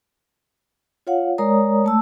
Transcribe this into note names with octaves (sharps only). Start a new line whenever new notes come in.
F4 C#5 F5 F#5
G#3 A#4 C#5 D5 A#5 D#6
A3 A5 E6